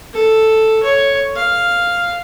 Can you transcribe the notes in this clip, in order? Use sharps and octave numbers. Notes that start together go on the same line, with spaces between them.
A4
C#5
F5